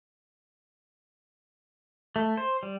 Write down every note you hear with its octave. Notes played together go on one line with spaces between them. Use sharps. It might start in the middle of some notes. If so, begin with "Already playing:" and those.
A3
C5
G3